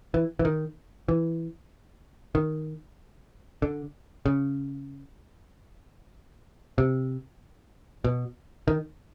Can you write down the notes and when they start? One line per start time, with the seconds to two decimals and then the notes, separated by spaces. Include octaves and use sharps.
0.14 E3
0.39 E3
0.45 D#3
1.08 E3
2.35 D#3
3.62 D3
4.26 C#3
6.78 C3
8.04 B2
8.68 D#3